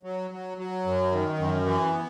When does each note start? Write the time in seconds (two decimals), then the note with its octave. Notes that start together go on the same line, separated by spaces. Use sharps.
0.03 F#3
0.30 F#3
0.58 F#3
0.85 F#2
1.11 D#3
1.38 F#2
1.66 E3
1.93 B3